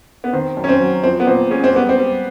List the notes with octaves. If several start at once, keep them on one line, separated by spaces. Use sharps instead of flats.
B3
D#3 C4
F#2
C#4
C4
F#3
F3 C4
B3
A#2 C4
G#3 C#4
C4
G3 B3
C4
G3